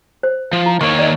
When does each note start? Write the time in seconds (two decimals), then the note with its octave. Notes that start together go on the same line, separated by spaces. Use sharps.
0.23 C5
0.53 F3
0.66 E4
0.81 D#3 A#3 C#5 C#6
0.99 D5 D#5